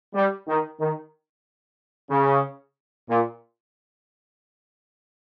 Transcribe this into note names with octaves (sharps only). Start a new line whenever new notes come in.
G3
D#3
D#3
C#3
A#2